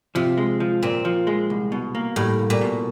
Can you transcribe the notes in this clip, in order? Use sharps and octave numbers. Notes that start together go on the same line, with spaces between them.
C3 F3
G#3
F3
A#2 C4
F3
G#3
C2
B2
A#3
A2 G3
C2
A#2
B2